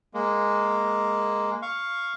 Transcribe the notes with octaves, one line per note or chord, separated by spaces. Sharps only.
G#3 A#3
F5 C#6